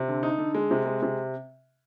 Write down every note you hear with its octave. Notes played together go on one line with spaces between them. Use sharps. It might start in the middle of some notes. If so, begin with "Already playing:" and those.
Already playing: C3
D3
D#4
D3
G#3
C3
G#3
C3